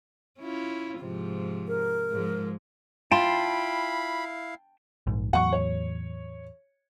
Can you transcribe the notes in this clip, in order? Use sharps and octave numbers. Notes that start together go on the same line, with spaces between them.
C#4 E4 F4
G#2 C3 F3
A#4
G#2 F3 G#3
E4 F4 F5 G5 A5 B5 C6
A#1 G#2
E2 A2 F#3 F#5 C#6
C#5